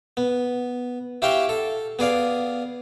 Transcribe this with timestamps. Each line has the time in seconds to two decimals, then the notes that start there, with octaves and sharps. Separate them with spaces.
0.17 B3
1.22 E4 F#4 G4 E5 F5 G5
1.49 A4
1.99 B3 G#4 D5 F5